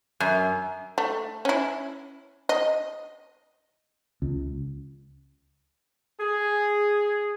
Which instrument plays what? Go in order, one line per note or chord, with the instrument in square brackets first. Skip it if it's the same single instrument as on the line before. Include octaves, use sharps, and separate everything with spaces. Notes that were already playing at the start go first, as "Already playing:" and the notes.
[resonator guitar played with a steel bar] F#2
[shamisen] A3
C#4 E4
D#5
[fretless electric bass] C#2
[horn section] G#4